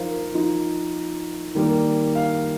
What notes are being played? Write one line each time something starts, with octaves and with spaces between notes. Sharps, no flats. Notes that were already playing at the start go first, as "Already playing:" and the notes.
Already playing: F3 D#4 A#4 C5 F5
F3 D#4
D#3 G3 A#3
F5